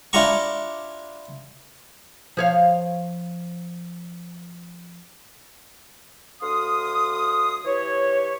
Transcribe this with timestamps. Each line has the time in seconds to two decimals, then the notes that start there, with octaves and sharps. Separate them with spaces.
0.13 D4 E4 F4 G4 A#5 C#6
2.37 F3 C#5 F5
6.42 D2 F5 C6 D#6
7.65 E3 G4 C#5